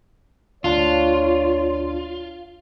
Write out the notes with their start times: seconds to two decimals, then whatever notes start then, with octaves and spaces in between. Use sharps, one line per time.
0.64 D2 D4 F4 C#5 C6